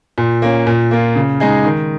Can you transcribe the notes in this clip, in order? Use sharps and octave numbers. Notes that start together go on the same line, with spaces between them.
A#2
A#3 C#4
A#2
A#3 F4
C#3
G#3 D#4 G#4
D#3